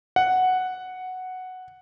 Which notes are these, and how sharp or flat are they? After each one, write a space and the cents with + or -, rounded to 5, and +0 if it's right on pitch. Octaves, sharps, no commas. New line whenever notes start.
F#5 +0